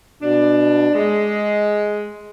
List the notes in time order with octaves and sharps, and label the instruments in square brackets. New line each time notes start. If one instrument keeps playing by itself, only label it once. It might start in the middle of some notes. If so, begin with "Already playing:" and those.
[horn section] B2 D4
G#3